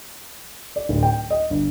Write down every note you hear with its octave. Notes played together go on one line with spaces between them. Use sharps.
D5
D1
G5
D#5
G1